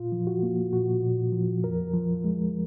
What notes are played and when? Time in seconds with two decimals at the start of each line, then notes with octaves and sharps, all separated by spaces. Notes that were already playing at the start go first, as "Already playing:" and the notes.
Already playing: A#2 F4
0.12 F3
0.27 F#4
0.43 A#3
0.73 A#2 F#4
1.03 A#2
1.33 F3
1.64 F2 A#4
1.93 F3
2.24 G#3